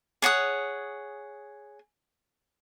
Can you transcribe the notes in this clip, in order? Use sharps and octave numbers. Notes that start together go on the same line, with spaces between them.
G#4 C#5 F#5 D#6